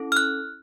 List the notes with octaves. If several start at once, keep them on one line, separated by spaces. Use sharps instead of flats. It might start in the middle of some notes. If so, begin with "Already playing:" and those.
Already playing: C#4 E4 A4
F6
F#6